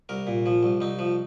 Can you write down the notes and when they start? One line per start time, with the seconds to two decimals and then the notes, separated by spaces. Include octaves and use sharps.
0.09 C2 A#4
0.27 A#2
0.46 F3
0.63 C2
0.81 C2 D#4
0.99 F3